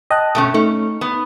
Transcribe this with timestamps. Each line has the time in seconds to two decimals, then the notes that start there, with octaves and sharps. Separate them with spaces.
0.11 D#5 G5 A5 F#6
0.35 B2 A3 C#4
0.54 A3 C#4 D#4
1.01 B3